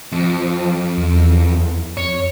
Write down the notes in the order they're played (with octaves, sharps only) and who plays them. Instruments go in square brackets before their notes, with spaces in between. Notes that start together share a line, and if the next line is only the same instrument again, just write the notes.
[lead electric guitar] F2 [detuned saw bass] F3
[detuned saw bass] E2
[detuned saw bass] F2 [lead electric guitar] C#5